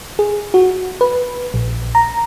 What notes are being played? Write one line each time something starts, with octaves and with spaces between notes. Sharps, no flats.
G#4
F#4
B4
A#1
A#5